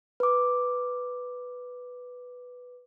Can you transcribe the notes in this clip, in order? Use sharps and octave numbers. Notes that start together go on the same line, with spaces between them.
B4 D6